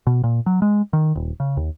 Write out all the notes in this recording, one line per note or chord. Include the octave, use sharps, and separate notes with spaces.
B2
A#2
F#3
G#3
D#3
D#1
C#3
D#2